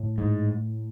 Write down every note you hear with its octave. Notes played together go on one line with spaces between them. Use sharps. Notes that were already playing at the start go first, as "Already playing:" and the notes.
Already playing: A2
G#2